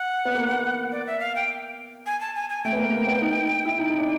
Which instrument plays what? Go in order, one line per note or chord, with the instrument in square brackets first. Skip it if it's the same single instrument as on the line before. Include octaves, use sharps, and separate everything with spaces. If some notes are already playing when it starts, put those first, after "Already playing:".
Already playing: [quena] F#5
[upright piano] B3
A#3
[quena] D5
E5
F5
G5
G#5
A5
G#5
G#5
[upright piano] A3 [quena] G5
[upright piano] B3
A#3
A#3
B3
D#4
E4
D#4
D#4
D4